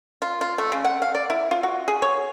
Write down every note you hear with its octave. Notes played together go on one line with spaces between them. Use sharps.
F4
F4
A3
C#3
F#5
F5
D5
E4
F4
F#4
G#4
C#5